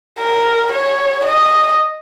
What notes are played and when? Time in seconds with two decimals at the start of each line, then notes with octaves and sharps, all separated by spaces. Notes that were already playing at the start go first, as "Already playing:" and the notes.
0.20 A#4
0.72 C#5
1.25 D#5